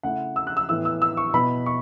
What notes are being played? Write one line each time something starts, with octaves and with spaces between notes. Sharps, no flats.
C#3 A3 E4 F#5
E6
F#6
E6
A2 E3 B3 E6
E6
E6
C#6
B2 B3 E4 B5
C#6